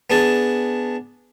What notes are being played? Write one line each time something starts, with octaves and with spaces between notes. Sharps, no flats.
B3 D4 G#4 A5